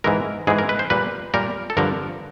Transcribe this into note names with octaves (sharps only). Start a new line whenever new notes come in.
G#2 E3 G#3 A#4
G#2 E3 G#3 G#4
A#4
B4
C5
A#2 G3 B4
A#2 G3 A#4
A4
G2 D3 F3 A#4